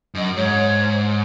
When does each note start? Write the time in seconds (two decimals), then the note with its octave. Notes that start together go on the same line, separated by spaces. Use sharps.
0.15 F#2 D#5
0.35 G#2 C#5